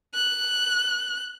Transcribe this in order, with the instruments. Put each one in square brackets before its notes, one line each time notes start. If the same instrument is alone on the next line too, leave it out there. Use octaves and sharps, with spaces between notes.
[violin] F#6